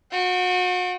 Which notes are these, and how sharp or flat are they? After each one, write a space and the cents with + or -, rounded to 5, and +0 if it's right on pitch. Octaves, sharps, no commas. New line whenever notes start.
F#4 -35 G5 -25